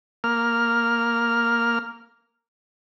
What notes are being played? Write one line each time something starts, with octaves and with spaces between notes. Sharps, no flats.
A#3 F6